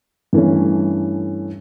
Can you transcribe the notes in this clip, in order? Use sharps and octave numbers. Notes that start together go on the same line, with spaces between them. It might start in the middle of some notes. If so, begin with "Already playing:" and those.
G2 E3 A3 C#4